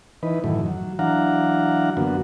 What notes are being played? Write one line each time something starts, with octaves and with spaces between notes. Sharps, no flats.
E3 D#4 B4
F#2 A2 D#3 E3
F#3
E3 F#3 D4 F5 F#5 A#5
F#2 D3 A#3 B3 F#4